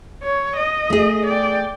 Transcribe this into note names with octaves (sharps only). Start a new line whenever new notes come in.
C#5
D#5
A3 G#4
D5 G5